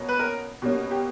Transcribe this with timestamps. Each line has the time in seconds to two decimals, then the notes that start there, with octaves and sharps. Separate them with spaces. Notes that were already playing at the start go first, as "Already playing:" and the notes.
Already playing: B2 A#3 C#4
0.09 B4
0.19 A#4
0.62 B2 G3 A#3 C#4
0.91 G4